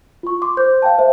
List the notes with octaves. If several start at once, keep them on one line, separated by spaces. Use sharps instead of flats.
F4 C#6
C6 D6
C5 G6
F5 G5 A5
C5 E5